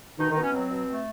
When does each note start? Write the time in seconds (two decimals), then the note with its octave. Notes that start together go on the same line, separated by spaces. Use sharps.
0.18 B2 D#3 D#4
0.30 D#3 D#4
0.36 B2
0.42 C#4
0.53 F#3 C4
0.70 B2
0.87 A3